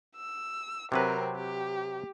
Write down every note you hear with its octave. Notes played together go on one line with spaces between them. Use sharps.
E6
C3 F#3 C4 A#4 B4
G4